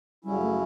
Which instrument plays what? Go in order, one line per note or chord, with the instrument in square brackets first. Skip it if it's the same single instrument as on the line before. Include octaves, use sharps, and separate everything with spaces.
[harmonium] F#2 C#3 F#3 C#4 E4 [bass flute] G3
[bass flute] A3